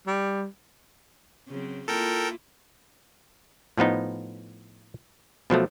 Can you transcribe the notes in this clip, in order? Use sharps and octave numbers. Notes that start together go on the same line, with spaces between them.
G3
C#3 F#3 C4
A#3 E4 F4 A4 A#4 G5
A2 F3 B3 D#4
B2 F3 F#3 A3